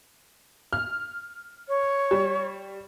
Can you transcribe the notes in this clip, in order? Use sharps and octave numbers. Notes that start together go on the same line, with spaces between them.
F6
C#5
G3